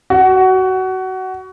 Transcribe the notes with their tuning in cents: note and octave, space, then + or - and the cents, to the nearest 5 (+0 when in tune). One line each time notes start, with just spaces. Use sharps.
F#4 +20